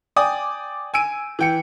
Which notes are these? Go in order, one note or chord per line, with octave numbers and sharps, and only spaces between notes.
D5 G5 G#5 D6 D#6
G#5 E6 D7 D#7
E3 G5 C#7